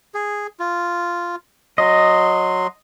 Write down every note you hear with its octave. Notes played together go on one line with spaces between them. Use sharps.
G#4
F4
F#3 D#5 C6